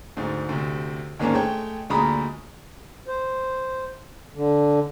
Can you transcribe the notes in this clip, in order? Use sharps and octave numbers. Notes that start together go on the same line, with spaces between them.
D2 G#2
D2 C3
D#2 G#2 A#3 C#4 D4
G#3 A3 C#5 G5
D2 A#2 G#3 A#5 B5 D#6
C5
D3